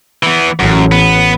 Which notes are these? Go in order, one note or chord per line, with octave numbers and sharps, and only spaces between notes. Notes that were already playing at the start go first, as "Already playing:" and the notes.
E3 B3
A1 F#2
B3